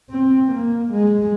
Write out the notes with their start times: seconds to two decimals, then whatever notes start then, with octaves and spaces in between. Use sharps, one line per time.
0.11 C4
0.52 A#3
0.92 G#3